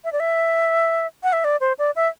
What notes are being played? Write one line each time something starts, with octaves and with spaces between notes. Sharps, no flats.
E5
D5
E5
F#5
E5
D5
C5
D5
E5